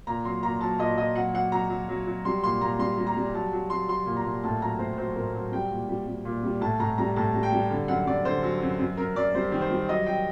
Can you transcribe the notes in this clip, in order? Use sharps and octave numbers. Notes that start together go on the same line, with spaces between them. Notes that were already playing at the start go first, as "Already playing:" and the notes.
A#2 A#5
F#3 C6
A#2 A#5
F#3 A5
A#2 D#5
A#2 D#5
F#3 F#5
F#3 F#5
F#3 A#5
F#3
F#3
F#3
G3 C6
A#2 C6
A#2 A#5
G3 C6
G3
A#5
G3
F#3 A5
F#3
F#3 C6
F#3 C6
A#2
A#5
A#2
A2 A5
F#3 A#5
A2 C5
F#3 C5
A2 A#4
F#3
G3 G5
A#2
G3
G3
A#2
G3
A2 A5
A2 A#5
G3 A#5
A2 A5
G3
G5
G3
D3
F#2 F#5
F#2 D5
D3 C5
F#3
F#2
F#2
F#2 A#4
F#2 D5
G3 C5
D#3
C5
G3
F#3 D#5
F#3 G5